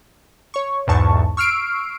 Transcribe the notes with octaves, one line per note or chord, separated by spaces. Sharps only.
C#5 C#6
B1 E2 G#2 A5 C#6
C#6 E6 F6 C7 D7